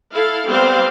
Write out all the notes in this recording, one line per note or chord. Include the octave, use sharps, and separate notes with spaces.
E4 A4 F5
G3 B3 C4 G4 C5 F5